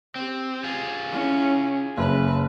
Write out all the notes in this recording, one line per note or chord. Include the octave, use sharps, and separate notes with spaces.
C4 G4
F4 G#4
C#4 E4
F#1 C#3 B4 E5